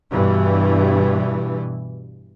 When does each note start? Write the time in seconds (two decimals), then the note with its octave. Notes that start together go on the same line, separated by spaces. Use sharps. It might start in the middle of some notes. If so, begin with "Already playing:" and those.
0.11 G2 B2 E3